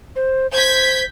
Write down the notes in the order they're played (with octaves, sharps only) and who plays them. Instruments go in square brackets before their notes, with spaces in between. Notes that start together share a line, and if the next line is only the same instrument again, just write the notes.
[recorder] C5
[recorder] C5 [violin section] G6 G#6 B6